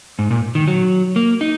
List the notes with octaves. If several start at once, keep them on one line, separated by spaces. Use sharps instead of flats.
G#2
A#2
D#3
F#3
A#3
D#4